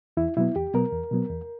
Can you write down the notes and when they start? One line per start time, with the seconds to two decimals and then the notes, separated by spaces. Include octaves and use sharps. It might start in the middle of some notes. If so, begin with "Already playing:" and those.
0.17 E2 E4
0.37 B2 F#3 B3 E4
0.56 E2 G4
0.73 B2 F#3 B3 A#4
0.92 E2
1.11 B2 F#3 B3
1.30 E2